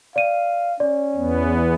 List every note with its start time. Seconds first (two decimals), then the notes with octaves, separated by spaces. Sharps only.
0.16 D5 F5 D#7
0.80 C#4 D5
1.16 E2 B3